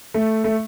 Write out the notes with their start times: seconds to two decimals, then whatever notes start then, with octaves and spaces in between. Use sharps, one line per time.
0.14 A3
0.44 A3